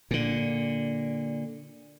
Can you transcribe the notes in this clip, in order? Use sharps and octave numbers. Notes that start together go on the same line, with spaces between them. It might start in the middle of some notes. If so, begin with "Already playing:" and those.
A#2 D3